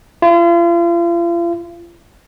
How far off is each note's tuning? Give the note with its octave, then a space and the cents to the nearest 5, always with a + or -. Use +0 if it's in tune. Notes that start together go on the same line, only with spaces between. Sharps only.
F4 -40